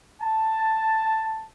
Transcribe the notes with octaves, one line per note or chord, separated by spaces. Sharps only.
A5